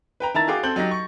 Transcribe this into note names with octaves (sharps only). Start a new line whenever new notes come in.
B4 G5 A#5
D#3 E4 A5 A#5 A6
F#4 G#4 F5 G5 D6
C4 A4 G6 F#7
F#3 D#4 G4 A#6
C#6